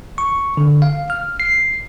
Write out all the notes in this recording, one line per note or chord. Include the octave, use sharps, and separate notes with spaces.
C#6
D3
F5
F6
C7